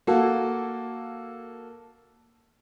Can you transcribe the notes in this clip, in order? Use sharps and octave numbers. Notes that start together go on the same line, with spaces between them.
A#3 F#4 A4